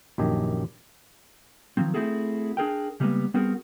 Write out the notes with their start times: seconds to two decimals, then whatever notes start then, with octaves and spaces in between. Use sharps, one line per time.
0.18 A#1 F#2 D#3 G4 D#5 G#5
1.77 D#3 F3 F#3 C4
1.94 A3 C4 E4 F#4 G#4 A4
2.57 D4 G#4 A#4 G5
3.00 C#3 G3 G#3 A#3 B3
3.34 G3 B3 C4 F#4 G#4 A#4